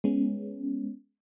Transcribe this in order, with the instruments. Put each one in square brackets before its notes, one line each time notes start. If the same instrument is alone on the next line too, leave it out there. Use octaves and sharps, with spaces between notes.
[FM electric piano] G#3 B3 C#4